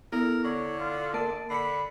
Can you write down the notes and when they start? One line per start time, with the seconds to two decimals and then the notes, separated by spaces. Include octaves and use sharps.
0.12 B3 E4 A4 A#4
0.44 D3 C#5
0.80 F4
1.14 A#3 A#4 A5 D7
1.50 D3 B5 C7 C#7